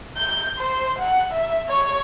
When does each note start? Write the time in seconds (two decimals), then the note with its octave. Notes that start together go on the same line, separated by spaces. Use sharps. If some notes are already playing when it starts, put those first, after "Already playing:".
0.17 G6
0.59 C5
0.99 F#5
1.32 E5
1.69 C#5